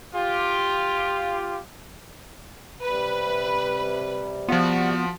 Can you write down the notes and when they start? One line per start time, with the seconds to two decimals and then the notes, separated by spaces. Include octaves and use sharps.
0.16 F4 G4
2.85 C3 G3 B4
4.49 F3 B3 F4 F#4